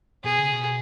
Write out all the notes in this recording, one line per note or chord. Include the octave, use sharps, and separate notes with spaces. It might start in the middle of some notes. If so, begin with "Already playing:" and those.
B2 G#4
C#3
B2